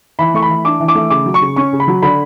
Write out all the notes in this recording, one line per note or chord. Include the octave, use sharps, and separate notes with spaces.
E3 B5
A3 C#6
B5
E3
D4 D6
E3
D6
A3
C#3 D6
F#3
C#6
C#3
C#4 C#6
C#3
B5
F#3
D3 B5